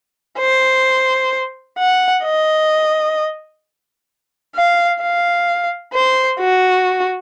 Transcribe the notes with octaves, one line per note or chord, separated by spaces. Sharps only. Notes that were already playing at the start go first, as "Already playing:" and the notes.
C5
F#5
D#5
F5
F5
C5
F#4